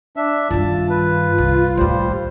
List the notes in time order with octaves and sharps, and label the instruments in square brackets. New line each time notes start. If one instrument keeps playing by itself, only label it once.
[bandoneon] D4 E5
[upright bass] G2 D#3 [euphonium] F4 [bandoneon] A5
[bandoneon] B4
[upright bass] C2
[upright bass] D#2 A2 [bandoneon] G3 C5